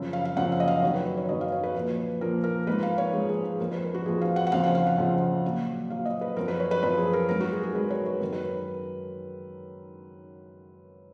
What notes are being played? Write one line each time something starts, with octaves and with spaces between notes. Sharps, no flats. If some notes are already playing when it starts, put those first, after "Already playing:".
Already playing: F#2 C#3 F3
F5
F5
F#2 C#3 F3 F#5
F5
D#5
F5
F#2 D#3 F#3 C#5
B4
C#5
C#5
F#2 D#3 F#3 D#5
F5
C#5
B4
A#2 F3 B4
A#2 F3 A#4
A#4
G#2 F3 B4
F5
C#5
G#2 F3 G#4
G#4
G#4
F2 F3 A#4
B4
A#4
F#4
F2 F3 G#4
F5
F#5
F#5
F2 C#3 F3 F5
F#5
F5
F#5
F2 C#3 F3
A#2 F#3
A#2 F#3 F5
D#5
B4
F#2 F3 A#4
B4
C#5
B4
F#2 F3 B4
G#4
A#4
G#2 F#3 A#4
F#4
G#4
G#4
G#2 F#3 B4
C#5
B4
F#2 D#3 F#3 A#4
B4